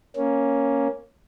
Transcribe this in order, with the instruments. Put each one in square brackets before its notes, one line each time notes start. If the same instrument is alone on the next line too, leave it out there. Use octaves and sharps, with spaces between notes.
[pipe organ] A#3 C#4